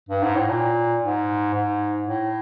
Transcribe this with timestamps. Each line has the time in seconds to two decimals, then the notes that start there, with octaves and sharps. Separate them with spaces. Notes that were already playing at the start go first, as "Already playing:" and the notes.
0.09 G2
0.23 G#2
0.36 A2
0.49 A#2
1.02 G#2
1.54 G#2
2.07 A2